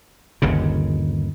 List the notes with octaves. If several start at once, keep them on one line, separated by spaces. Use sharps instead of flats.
G1 D#2 C#3